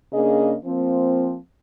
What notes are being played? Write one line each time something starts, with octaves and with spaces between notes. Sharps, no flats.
C#3 A#3 D4 G#4 D#5
F3 A#3 C4